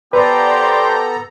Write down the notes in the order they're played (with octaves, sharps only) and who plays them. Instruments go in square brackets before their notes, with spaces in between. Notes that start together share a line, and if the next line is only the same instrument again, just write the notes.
[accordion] B3 A4 A#5 [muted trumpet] G4 [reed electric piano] B4 [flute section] C5 D5 C6